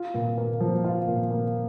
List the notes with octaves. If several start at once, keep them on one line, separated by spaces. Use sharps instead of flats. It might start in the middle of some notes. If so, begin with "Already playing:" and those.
Already playing: F4
A#2
A#3
F3
F4
A#2
A#3